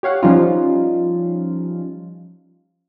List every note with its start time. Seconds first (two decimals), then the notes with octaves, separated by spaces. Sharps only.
0.03 G4 C#5 F5 F#5
0.23 F3 G3 C#4 D#4 F4